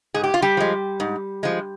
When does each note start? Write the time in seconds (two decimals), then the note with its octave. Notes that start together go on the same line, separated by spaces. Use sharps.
0.14 G#2 G#4
0.24 G4
0.34 F4
0.42 G3 G4
0.57 F3 G#3
1.00 G#2
1.43 F3 G#3